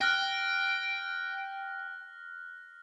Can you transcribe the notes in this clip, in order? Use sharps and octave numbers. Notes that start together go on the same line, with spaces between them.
G5 F6 F#6 A#6